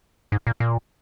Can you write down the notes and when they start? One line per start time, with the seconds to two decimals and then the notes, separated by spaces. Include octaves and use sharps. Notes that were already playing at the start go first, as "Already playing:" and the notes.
0.32 G#2
0.47 A#2
0.60 A#2